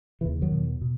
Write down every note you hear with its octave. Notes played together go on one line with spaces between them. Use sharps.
D#2 C#3 E3
D#3 F#3
E2 B2
B2